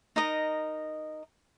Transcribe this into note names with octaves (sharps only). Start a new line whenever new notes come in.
D#4 A#4 D#5